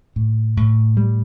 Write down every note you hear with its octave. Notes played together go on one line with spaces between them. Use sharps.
A2
A2
G3